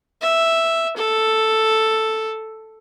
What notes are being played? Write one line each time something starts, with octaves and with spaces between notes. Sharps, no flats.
E5
A4